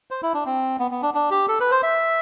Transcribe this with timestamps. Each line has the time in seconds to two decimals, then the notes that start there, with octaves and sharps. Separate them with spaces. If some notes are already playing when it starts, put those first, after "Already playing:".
0.11 C5
0.22 E4
0.34 D4
0.45 C4
0.79 B3
0.91 B3
1.02 D4
1.14 D4
1.31 G4
1.48 A4
1.60 B4
1.71 C5
1.83 E5